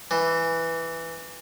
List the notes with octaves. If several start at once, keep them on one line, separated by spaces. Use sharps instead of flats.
E3